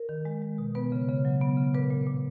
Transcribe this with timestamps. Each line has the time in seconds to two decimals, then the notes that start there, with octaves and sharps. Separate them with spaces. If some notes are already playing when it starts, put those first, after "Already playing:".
Already playing: A#4
0.09 D#3
0.25 G#3
0.42 G#3
0.58 B2
0.75 B3 B4
0.92 C#3
1.08 C#3
1.25 F#3
1.41 B3
1.57 C#3
1.74 A#2 B4
1.90 A#2
2.07 A#2